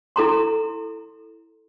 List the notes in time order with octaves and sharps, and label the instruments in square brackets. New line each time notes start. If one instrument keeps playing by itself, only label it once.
[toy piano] E4 A4 A#5 C6